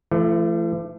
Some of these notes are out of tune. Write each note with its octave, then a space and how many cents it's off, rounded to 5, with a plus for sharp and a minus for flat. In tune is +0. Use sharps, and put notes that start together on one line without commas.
E3 +45 A3 -5